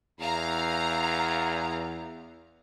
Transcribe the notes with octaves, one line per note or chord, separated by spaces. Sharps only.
E2 F5 A#5